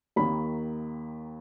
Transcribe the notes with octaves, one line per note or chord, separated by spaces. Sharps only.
D#2 D#3 A#3 B5